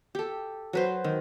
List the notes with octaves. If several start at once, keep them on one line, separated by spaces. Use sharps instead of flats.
G4 A4
F#3 B4 C5
D#3